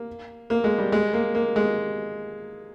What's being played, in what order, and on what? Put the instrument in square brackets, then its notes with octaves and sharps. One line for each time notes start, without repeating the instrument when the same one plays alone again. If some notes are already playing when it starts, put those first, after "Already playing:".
Already playing: [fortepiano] A#3
A#3
G#3
G3
G#3
A#3
A#3
G#3